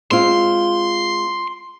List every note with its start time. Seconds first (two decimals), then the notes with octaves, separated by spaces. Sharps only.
0.11 G#3 C4 F4 C6